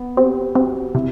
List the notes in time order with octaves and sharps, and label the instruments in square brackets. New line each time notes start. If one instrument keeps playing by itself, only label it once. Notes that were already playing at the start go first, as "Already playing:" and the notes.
Already playing: [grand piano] B3
[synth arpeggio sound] C4 [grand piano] G4
[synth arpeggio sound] C4 [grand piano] F#4
[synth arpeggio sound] C3 [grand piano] E4